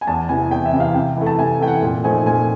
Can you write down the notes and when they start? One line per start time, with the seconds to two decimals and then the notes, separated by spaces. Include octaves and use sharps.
0.01 G#5
0.07 E2 A5
0.29 C3 E3 G#5
0.51 E2 G5
0.66 E5
0.73 C3 E3
0.80 F5
0.94 C3 G5
1.16 E3 A3
1.27 A5
1.38 C3 G#5
1.60 E3 A3 G5
1.67 F#5
1.82 A#2
2.04 F3 A3 C4 D#4 G#5
2.26 A#2 G#5